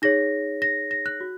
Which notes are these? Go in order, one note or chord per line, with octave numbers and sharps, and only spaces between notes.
D#4 G#4 C#5 A#6
A#6
A#6
F#6
F#4